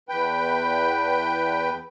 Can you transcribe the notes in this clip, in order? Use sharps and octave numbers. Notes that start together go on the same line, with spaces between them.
E2 B4 G5